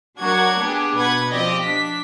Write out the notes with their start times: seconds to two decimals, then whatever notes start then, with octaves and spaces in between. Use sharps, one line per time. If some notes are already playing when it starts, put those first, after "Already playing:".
0.18 F#3 D4 F#4 A#4 F#5 G#6
0.59 B3 D4 G4 G#4
0.96 B2 B4 F#5 B5 G#6
1.31 F3 C4 G4 D5 D#5
1.62 D4 B6